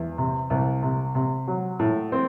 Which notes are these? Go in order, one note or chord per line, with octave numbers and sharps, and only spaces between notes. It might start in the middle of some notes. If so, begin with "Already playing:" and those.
Already playing: E2
C3
C2
C3
C3
F#3
A2
C4